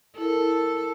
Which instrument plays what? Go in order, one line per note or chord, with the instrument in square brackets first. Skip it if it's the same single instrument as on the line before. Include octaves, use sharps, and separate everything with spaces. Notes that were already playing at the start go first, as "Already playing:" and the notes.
[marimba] E4 A#4 [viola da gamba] A4